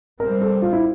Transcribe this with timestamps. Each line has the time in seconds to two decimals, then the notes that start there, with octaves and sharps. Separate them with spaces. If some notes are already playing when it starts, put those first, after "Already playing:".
0.20 C3 G3 C4 A#4
0.41 A4
0.62 F4
0.73 E4